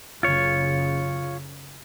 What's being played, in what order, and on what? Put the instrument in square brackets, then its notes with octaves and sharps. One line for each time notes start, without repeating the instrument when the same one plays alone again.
[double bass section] F#1 C#3 [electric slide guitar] F4 C#5